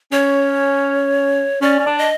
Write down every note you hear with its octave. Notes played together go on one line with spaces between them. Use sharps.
C#4 C#5
C#4 D5
C#4
D4
D#5